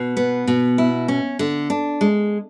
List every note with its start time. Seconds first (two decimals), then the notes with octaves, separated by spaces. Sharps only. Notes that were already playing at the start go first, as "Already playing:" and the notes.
Already playing: B2
0.17 B3
0.47 B2
0.78 E4
1.08 C#4
1.39 D3
1.70 D4
2.01 G#3